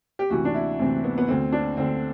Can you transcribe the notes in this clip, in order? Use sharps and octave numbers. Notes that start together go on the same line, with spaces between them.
G4
D2 C3 E3 F#4
D4
E4
D2 C3 E3 C4
B3
B3
D2 D3 C4
D4
D2 D3 C4